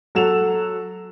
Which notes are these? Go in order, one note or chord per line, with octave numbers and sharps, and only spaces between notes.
F#3 A4 F#5 E7 F7